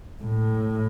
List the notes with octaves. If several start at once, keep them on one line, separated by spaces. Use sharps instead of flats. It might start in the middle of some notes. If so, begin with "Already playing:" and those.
A2